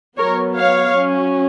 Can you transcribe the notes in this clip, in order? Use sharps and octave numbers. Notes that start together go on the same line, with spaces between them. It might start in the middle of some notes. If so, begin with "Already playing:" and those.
F#3 B3 A#4 C#5
C#5 F5
F#3 C#4